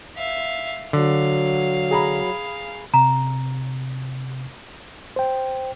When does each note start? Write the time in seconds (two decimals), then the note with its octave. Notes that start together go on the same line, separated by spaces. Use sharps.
0.17 E5 F5
0.93 D3 F#3 F5
1.91 G#4 A#5 B5
2.94 C3 A#5
5.16 C5 G5